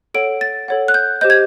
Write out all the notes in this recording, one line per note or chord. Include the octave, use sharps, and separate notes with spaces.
A4 C#5 F#5 D7
A6
A4 C#5 F#5
F#6
G6
G4 C5 D#5 G6
G#6